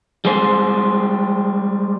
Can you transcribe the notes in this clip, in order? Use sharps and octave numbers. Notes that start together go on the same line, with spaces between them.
G3 G#3 C5